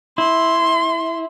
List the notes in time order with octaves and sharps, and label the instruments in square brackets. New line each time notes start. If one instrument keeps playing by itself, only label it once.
[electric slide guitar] E4 [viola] C6